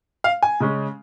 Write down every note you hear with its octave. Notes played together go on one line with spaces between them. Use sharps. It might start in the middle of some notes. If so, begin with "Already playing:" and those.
F5
G#5
C#3 G#3 C#4